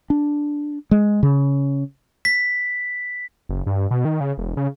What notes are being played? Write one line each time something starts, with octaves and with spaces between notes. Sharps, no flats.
D4
G#3
C#3
B6
F#1
G2
B2
D#3
C#3
E1
C#3